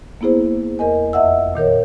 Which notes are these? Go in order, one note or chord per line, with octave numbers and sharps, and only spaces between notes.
A#3 B3 E4 G#4 C5
E2 A#4 D#5 G#5
F2 D#5 E5 F#5 E6
A#2 D#3 A#4 C#5